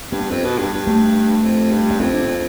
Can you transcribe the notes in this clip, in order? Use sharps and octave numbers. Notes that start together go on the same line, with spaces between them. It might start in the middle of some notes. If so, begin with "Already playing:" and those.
G2 B3
F2
B2
G2
G2
A3
F2
G2
B3
F2 C4
D4
C4